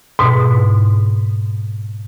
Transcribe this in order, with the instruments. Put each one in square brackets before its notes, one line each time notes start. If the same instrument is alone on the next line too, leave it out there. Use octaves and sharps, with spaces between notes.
[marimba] G#2 B2